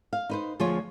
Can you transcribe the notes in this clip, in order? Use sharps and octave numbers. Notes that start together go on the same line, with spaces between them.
F5
D#4 B4 C5
D2 F3 F4 G#4 C#5